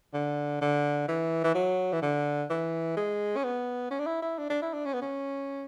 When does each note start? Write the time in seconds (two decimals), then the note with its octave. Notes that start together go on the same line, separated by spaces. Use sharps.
0.14 D3
0.61 D3
1.08 E3
1.44 E3
1.55 F#3
1.93 E3
2.02 D3
2.50 E3
2.97 G#3
3.36 C#4
3.44 B3
3.91 C#4
3.99 D4
4.06 E4
4.22 E4
4.38 D4
4.50 D4
4.62 E4
4.73 D4
4.85 C#4
4.94 B3
5.02 C#4